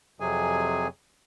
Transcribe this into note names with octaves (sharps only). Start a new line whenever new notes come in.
F2 C3 F#3 G#4 G#5